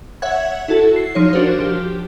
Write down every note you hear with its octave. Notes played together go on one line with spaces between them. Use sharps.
C#5 E5 F#5 G#6
E4 F#4 A4
C7
F3 D#4 C#5
D4 F#4 A#4 C5
F3 G4